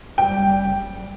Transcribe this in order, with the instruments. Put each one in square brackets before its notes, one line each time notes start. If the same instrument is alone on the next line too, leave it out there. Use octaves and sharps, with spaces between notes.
[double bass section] F#1 G3 [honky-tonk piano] G5